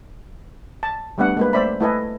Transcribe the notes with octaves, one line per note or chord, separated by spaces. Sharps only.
A5
G3 A3 B3 D4 F#5
G#3 A#3 B4
A3 C5 D5 E5 B5
A3 E4 A4 B4 D#5 G#5